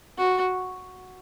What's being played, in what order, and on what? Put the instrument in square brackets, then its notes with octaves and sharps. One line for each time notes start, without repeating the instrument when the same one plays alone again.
[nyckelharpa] F#4